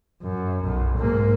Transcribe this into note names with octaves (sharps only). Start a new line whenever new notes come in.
F#2
B1
G#2 A#3